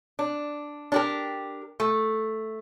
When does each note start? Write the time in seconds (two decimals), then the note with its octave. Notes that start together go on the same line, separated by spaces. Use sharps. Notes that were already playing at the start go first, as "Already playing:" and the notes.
0.19 D4
0.92 D4 G4 A#4
1.80 A3